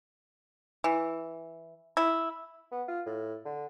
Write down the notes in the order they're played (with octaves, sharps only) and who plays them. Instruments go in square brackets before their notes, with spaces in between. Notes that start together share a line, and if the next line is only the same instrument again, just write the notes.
[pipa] E3
E4
[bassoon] B3
F4
A2
D3